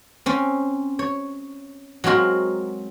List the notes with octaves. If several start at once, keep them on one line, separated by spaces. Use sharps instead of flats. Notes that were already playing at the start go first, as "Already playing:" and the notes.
C4 C#4
C#5
F#3 G#3 C4 F#4 A#4